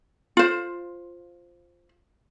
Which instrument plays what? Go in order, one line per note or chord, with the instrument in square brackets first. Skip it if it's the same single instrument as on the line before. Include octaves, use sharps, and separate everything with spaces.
[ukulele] F4 C5